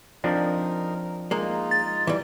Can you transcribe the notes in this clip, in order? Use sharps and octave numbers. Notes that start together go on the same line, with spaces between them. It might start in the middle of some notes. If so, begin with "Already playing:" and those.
F3 C4 D4 D#4 A#4
G#3 A#3 D#4 F4
A6
E3 G3